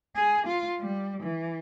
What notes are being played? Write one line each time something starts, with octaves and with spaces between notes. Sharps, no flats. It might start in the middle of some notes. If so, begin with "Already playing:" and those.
G#4
F4
G3
E3